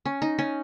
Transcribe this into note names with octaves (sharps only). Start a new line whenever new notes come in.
C#4
D#4
C#4